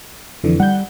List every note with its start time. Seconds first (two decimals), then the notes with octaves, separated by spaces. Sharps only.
0.44 F2 D3 E3
0.60 G3 F#5 G6